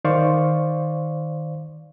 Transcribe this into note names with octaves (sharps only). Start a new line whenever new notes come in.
D#3 C5 D5 F5 C#6